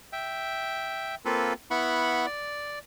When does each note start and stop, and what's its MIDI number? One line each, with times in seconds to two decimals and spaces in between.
0.13 1.15 76
0.13 1.15 79
1.25 1.53 58
1.25 1.53 60
1.25 1.53 65
1.25 1.53 69
1.25 1.53 71
1.71 2.26 59
1.71 2.26 64
1.71 2.26 78
1.71 2.26 83
1.71 2.26 85
2.26 2.79 74